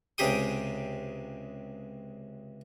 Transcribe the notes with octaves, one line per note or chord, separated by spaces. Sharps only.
C#2 C3 G4 G#4 G5 D#6